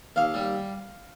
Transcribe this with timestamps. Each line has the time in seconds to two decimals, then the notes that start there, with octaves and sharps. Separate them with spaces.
0.16 D#2 F5
0.34 G3